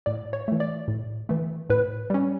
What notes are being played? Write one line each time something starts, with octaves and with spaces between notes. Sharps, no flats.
A2 D5
C#5
E3 A3
D5
A2
E3 A3
A2 B4
G3 C#4